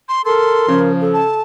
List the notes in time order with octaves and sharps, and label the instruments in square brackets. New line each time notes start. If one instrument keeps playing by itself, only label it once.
[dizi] C6
[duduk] A4 [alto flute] A#4 [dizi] C6
[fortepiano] C#3 [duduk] F3
[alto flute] A4
[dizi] A5